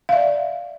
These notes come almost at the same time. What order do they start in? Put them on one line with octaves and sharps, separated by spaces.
F5 E5 D5